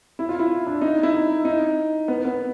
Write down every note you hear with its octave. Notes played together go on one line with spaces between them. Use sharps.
E4
F4
E4
D4
D#4
E4
D#4
D#4
B3
B3